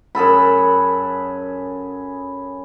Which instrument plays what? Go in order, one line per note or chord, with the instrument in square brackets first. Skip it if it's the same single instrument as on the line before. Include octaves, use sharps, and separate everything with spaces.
[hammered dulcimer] F#2 G#4 A4 B5